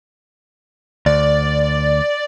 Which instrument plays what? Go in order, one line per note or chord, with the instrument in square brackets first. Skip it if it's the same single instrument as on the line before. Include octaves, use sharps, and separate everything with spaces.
[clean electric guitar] D2 [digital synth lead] D5